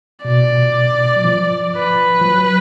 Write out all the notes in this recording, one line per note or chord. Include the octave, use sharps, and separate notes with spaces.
B2 D5
F#3
F3
B4
F3
F#3